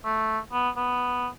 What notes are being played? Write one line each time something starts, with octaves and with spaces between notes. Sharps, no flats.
A3
B3
B3